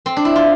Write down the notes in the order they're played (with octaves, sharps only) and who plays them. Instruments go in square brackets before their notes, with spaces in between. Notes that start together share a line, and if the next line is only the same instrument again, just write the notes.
[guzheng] C4
D4
E4
F4